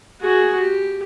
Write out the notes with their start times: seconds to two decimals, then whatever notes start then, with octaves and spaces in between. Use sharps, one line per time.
0.21 F#4 G#4
0.60 G4